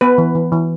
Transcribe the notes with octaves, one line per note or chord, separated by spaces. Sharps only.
B3 B4
E3
E3
E3